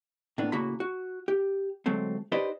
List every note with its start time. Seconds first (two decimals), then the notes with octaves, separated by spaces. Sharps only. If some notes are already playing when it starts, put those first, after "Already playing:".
0.38 A2 A#3 B3 D4
0.52 A2 C#3 A#3 F#4 A#5 B5
0.80 F#4
1.28 G4
1.86 D2 F#3 G#3 A3 C4
2.32 D#4 G4 B4 C5 D5 D#5